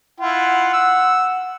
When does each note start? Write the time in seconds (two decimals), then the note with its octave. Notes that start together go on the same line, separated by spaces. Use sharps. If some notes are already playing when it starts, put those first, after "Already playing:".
0.21 E4 F4 F#5
0.73 E6